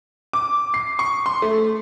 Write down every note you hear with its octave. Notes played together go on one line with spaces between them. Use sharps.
D6
C7
C#6
C6
A3